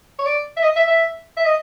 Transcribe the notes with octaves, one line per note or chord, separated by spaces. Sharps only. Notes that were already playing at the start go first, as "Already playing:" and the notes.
C#5
D5
E5
D#5
E5
E5
E5
D#5